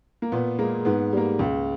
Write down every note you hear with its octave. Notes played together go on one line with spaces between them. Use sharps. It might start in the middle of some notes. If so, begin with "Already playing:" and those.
A#3
A#2 B3
G#3 A#3
G#2 B3
G3 A#3
C#2